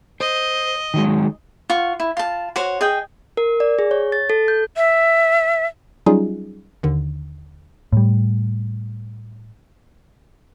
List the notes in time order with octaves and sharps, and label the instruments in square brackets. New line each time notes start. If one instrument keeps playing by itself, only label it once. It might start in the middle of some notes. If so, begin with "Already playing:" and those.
[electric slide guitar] C5 [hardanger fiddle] D#5
[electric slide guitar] D#3 F#3 G#3
[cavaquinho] F4 F#5 C#6
E4
F4 A5
F#4 C5 C#5
G#4 D#5 G5
[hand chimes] A#4
D5
G#4
C#5
A6
A4
G6
[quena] E5
[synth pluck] F#3 G3 C#4 D#4 F4 G#4
D#2 D3 D#3
[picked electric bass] A2 G3